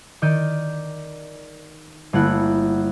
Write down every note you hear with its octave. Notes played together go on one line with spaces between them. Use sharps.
D#3 D5 G6 D#7
G1 A3 A#3 E4 F#5 F#6